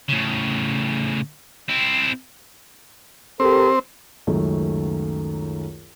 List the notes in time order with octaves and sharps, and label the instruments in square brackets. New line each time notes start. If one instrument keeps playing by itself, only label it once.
[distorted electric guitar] A2 C#3
C4 E4
[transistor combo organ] C4 [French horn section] G4 A4 A#4
[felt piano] C#2 F#2 D#3 A3